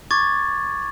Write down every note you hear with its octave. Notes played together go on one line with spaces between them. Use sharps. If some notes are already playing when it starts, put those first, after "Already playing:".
C#6 D6 G#6 A6